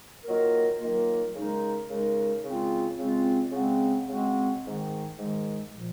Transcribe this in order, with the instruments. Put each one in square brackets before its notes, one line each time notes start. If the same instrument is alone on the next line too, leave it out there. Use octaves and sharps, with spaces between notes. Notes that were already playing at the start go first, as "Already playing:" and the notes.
[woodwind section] D#3 F#3 A#3 F4 A#4
D#3 F#3 A#3 F4 A#4
C#3 G#3 D#4 A#4
C#3 G#3 D#4 A#4
C#3 G#3 C4 F4
C#3 G#3 C4 F4
C#3 G#3 C4 F#4
C#3 G#3 C4 F#4
G#2 D#3 G#3
G#2 D#3 G#3
A#2 F3